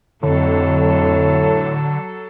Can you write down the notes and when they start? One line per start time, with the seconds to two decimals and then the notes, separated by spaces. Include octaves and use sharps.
0.23 F2 A2 D3 F#3 A4